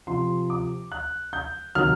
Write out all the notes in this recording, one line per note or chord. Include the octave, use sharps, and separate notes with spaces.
C3 F3 C6
D6
F#6
G6
C3 D#3 F#3 F6